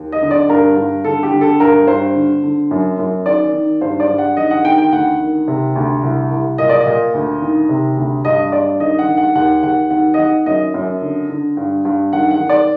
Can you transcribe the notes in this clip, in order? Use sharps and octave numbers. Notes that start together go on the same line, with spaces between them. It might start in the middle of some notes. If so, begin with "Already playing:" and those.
Already playing: D#2
D#5
D3
D5
G2 A#4
G2
D3 A4
G4
D3
A4
G2 A#4
G2 C5
D3
D3
F#2
F#2
D#3 D5
D#3
G2 C5
D5
G2
F#5
D#3 D#5
F#5
D#3 G5
G5
D2 F#5
D#3
C3
D2
C2
C2
A#2 D#5
D5
D#5
A#2
D2
D#3
C3
D2
G2 D#5
G2 D5
D#3 D#5
F#5
D#3
F#5
D#2 F#5
D#2 F#5
D#3 F#5
D#5
D#3 F#5
F#2 D#5
F#2
D3
D3
G2
G2
D#3 F#5
F#5
D#3
D5